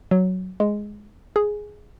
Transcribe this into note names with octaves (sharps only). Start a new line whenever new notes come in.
F#3
G#3
G#4